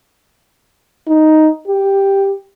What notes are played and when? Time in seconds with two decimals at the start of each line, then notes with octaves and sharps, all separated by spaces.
1.07 D#4
1.68 G4